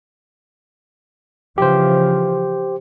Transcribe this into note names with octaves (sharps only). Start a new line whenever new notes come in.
C#3 E3 F3 G4 C5